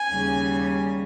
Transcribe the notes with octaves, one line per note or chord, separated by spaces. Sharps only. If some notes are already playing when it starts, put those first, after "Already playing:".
Already playing: G#5
D#2 C#3 G3